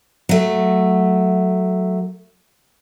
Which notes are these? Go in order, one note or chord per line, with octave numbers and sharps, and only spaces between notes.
F#3 A3